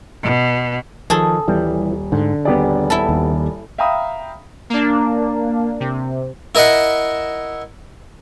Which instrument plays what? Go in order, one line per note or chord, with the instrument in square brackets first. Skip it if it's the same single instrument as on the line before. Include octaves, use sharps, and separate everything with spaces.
[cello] B2
[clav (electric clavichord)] D#3 [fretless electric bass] F3 [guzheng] G#4 A4
[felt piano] D#1 [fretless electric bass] E3 [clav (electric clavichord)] G3
[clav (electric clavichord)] G#2 [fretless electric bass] D3
[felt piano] D#1 D5 [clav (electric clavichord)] B3 G4 G#4
[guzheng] E4 A4
[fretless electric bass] D#2
[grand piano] E5 F5 G5 A#5 B5 D#6
[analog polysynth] A#3 D4
C3
[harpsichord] E4 A#4 D#5 E5 F#5